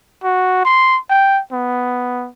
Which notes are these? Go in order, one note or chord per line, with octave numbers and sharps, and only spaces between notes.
F#4
C6
G5
B3